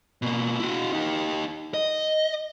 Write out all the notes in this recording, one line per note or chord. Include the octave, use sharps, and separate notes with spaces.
B2 A#3
E4 F#4
D#4 G4
D#5